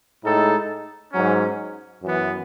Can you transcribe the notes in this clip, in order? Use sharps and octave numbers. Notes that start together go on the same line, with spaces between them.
A2 G#3 D#4 A4
G#2 F#3 C#4
F#2 E3 B3